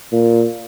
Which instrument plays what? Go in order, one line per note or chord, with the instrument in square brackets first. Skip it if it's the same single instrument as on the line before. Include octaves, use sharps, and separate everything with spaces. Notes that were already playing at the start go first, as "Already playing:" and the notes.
[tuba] A#2